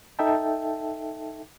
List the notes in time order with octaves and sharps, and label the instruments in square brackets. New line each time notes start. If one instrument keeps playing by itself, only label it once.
[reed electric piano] D#4 A4 E5 G5 A5